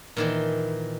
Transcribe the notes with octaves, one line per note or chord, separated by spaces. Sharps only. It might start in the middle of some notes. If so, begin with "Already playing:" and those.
A#2 D#3 E3